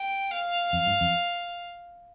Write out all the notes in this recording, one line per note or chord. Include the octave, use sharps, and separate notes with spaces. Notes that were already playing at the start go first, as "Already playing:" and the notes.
Already playing: G5
F5
F2
G2
F2